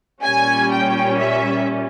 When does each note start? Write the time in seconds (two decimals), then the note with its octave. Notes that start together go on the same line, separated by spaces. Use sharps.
0.23 A#2 G3 C#4 G#5
0.71 G5
1.18 E5